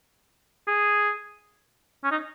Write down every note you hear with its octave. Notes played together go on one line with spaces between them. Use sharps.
G#4
C#4
D#4